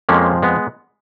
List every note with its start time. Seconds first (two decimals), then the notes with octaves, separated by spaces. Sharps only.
0.09 F2 F3 G#3 A#3 C#4
0.42 G#3 B3